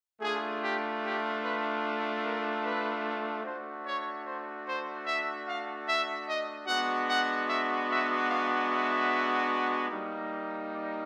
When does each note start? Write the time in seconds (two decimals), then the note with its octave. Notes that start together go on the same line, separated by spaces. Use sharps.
0.21 A3 D4 F4 G#4
0.61 G4
1.02 G4
1.42 B4
2.23 A#4
2.63 B4
3.44 A3 D4 F#4 C5
3.84 C#5
4.25 C5
4.65 C5
5.05 E5
5.46 F5
5.86 E5
6.26 D#5
6.66 G#3 B3 D4 F#4 F#5
7.07 F#5
7.47 E5
7.88 E5
8.28 F5
8.68 E5
9.89 G3 A#3 D#4
10.70 D5